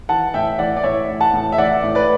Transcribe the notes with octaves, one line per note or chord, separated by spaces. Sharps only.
E3 F#5 A5
A2 E5 G5
E3 D5 F#5
D5
A2 C#5 E5
E3
F#5 A5
A2
E5
E3 D5 F#5
A2
B4 D5